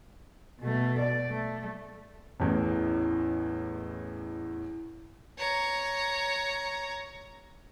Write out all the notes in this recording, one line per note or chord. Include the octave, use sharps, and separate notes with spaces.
B2 A3
D5
A3
A1 E2 A2
C#5 A#5